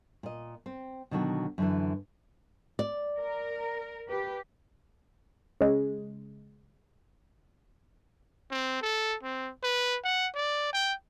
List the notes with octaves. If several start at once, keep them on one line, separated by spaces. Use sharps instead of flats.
A#2 D#5
C4
B2 D3 D#3 F#3 F#4
F#2 D3 E3
D5
A#4
G4 B4
C#3 G#3
C4
A4
C4
B4
F#5
D5
G5